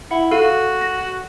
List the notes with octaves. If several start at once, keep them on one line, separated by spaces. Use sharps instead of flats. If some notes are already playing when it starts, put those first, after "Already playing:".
E4 F#5
F#4 A4 F5 D#7
A#6